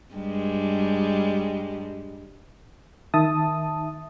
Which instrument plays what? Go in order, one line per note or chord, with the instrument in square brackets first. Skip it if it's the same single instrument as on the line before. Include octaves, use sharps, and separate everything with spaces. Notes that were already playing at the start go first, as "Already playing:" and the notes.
[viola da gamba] G2 G3 G#3
[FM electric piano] D#3 E5 A5 D#6